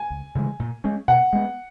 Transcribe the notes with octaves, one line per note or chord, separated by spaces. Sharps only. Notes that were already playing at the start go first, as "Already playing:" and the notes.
Already playing: G#5
C#2
C#3 E3 G#3
A#2
G#3 C#4
B2 F#5
G#3 B3